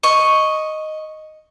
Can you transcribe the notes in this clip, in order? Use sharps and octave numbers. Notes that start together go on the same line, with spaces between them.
D#5 C#6